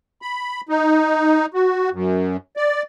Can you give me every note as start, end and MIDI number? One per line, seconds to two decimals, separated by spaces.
0.22 0.61 83
0.69 1.46 63
1.54 1.89 66
1.92 2.37 42
2.57 2.82 74